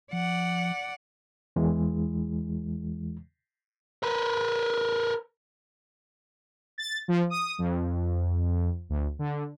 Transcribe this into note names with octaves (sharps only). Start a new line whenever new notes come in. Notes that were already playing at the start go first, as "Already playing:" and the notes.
F3 D5 F#5
E2 E3 G#3
A#4 B4
A6
F3
D#6
F2
D2
D3